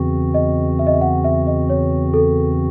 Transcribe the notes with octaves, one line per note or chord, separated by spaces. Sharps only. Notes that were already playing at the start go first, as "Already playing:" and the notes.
Already playing: E2 C#3 E3 C4 F#4
D#5
E5
D#5
E5
F#5
E5
D#5
C#5
A4